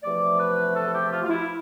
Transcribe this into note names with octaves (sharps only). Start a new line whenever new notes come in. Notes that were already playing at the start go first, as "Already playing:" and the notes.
E2 C3 F3 A3 D5
B4
A4
G4
F4
F4
E4